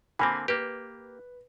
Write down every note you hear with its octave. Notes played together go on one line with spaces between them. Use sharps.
D3 A#3 C4 G#5 B5
A#3 G4 B4